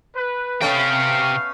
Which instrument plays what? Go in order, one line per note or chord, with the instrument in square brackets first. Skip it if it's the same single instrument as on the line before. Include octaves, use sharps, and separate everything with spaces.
[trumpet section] B4
[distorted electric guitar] C3 G5 [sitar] A3 B3 C#4 [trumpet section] F5